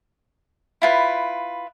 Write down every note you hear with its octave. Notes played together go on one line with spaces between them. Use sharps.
E4 F4 B4